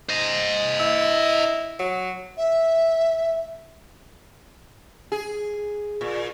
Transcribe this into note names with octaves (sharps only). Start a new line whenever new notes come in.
C5 D#5
E4
F#3
E5
G#4
A#2